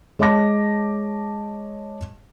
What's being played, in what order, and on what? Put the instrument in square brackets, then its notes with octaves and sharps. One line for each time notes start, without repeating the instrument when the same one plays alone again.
[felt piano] G#3 C#5 D#5 A5 D6 A#6